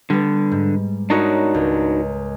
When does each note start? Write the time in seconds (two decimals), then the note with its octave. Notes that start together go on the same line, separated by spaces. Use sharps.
0.10 D3 G3 B3
0.52 G#2
1.10 D4 D#4 F#4 A#4 C#5 D#5
1.54 C#2